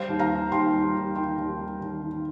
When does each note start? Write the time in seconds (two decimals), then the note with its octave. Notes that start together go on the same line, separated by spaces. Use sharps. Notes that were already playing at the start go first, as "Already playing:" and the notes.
Already playing: G3 C5 F5
0.09 D#2
0.19 F5 A#5
0.30 D#3
0.52 D#2 G5 C6
0.74 G3
0.95 D#2
1.16 D#3 G5 C6
1.38 D#2
1.59 G3
1.81 D#2
2.02 D#3